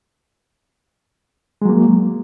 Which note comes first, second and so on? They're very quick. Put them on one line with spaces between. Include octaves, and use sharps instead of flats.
G#3 F#3 A#3